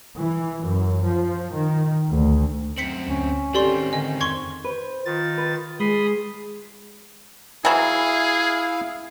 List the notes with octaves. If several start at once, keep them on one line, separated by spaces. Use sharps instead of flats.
E3
F#2
F3
D#3
D2
F#2 C4 B6 C#7 F#7
D2 C#4
D#3 C4 G4 A4 D5 C6
G4
D3 D#5 G#5
F2 C6 C#6 G#6
B4 C5
D#3 F4 A6
B4
G#3 G#4 B5 C6 D#6
E3 F#3 E4 G#4 F5